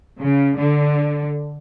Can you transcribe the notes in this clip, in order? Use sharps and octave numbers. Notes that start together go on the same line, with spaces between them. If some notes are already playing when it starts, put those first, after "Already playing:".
C#3
D3